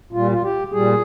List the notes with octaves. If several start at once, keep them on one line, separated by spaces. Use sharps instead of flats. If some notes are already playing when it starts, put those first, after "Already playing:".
A#2 G3 F4
F4
G4
A#2 G3 G#4